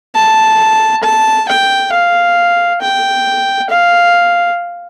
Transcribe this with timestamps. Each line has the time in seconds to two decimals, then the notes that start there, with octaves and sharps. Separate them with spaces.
0.15 A5
1.03 A5
1.48 G5
1.93 F5
2.81 G5
3.70 F5